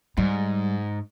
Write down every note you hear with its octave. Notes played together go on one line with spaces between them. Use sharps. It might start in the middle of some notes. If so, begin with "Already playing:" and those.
G#2 G3